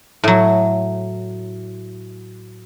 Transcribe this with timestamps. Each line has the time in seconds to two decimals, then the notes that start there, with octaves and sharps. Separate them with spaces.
0.24 A2 F#3